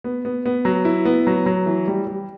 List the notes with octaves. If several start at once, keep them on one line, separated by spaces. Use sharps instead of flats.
B3
B3
B3
F#3
E4
B3
F#3
F#3
E3
G3
G3